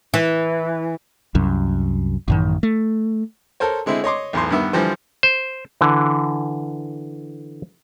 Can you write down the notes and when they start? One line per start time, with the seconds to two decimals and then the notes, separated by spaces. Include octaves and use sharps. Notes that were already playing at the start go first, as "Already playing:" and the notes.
0.14 E3
1.35 C2 F#2
2.28 A1 F#2 D#3
2.63 A3
3.60 A4 A#4 C5 C#5
3.86 D3 G#3 C4 E4
4.04 C#5 D#5 C6 D6
4.33 B1 E2 A2 C6
4.50 G2 D#3 B3 E5
4.73 D3 E3 F3 G3 C5
5.23 C5
5.81 D3 E3